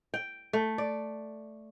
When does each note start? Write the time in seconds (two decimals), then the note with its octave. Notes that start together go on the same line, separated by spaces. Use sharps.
0.14 G5
0.53 A3
0.78 D5